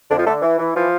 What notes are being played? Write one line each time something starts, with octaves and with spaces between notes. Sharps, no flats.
F2 D3 D4
F3 F4
D3 A3 A4
E3
E3
E3 F3 F4